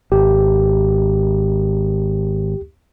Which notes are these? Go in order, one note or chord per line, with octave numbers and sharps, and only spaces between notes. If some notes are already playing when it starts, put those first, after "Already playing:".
G#1 G4